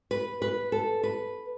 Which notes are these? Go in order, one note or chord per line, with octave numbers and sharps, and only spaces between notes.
B4
B4
A4
B4